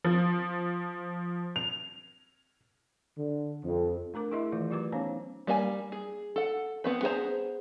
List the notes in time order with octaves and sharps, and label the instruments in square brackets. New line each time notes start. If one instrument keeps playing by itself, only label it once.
[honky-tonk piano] F3
F7
[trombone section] D3
F2
[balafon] A3 D4 A#4 D6
E4 G#4 D#5 E5 C6
D#3 E3 A3 F4
F#3 F4 G4 B4 D6
B3 C#4 D#4 C5 C#5 F5
[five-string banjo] G3 A#3 D5 G#5
G#4
A4 F#5
B3 C4 B4
B3 G#4 B4 C5 A#5